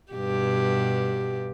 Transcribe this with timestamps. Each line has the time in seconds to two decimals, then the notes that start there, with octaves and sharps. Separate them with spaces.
0.12 G2 B2 G4